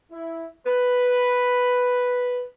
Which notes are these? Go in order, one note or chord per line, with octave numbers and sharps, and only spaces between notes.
E4
B4